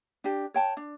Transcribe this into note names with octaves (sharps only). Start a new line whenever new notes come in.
D4 G4
C#5 G5 A5
D4